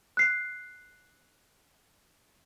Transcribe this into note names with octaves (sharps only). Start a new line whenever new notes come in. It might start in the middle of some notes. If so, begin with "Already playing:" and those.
F#6 C7